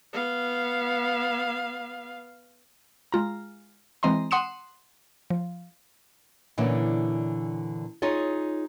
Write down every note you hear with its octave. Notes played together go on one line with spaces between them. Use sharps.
B3 F5
G#3 F4 A#5
E3 G#3 C4 D#5 A#5 C6
F#5 C6 D#6 C#7 E7
F3
A#2 D3 E3 C#4 D4
D#4 F4 G#4 C#5